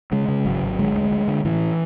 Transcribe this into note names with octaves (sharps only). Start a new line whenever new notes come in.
C#3 G#3
C#3
G#1 F#3
G#1
D3 G#3
D2
D2
D3
A2 E3